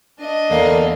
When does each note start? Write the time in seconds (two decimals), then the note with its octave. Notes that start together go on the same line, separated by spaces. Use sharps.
0.19 D4 D#5
0.51 E2 D3 A#3